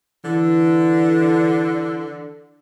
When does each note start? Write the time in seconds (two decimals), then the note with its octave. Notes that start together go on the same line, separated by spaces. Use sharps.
0.25 D3 E3